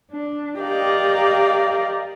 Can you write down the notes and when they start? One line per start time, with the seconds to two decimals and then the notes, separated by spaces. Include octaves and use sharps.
0.11 D4
0.60 G4 A#4 D5 D#5 F5